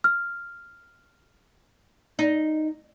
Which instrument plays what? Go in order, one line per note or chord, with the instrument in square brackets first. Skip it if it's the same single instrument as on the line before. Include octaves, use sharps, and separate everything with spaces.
[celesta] F6
[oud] D#4